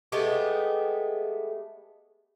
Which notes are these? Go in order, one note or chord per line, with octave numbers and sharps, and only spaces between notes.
G#3 A3 B3 G4